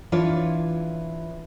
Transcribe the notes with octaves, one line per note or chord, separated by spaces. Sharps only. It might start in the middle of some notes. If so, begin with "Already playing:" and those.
E3 D4 F4 C#5